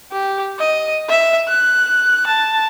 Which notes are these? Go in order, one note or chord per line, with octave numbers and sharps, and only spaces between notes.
G4
D#5
E5
F#6
A5